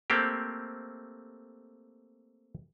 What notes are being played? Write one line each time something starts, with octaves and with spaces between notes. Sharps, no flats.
A3 A#3 C4 G4